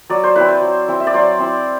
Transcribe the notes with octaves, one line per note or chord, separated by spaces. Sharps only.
F#3 D5
C5
C4 E4 B4
C5
F#3
C4 E4
E5
D5
F#3 C5
C4 E4